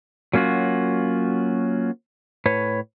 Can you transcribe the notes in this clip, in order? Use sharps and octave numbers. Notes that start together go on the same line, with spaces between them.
F#3 A#3 C#4 F4 F#4
A2 B4 C#5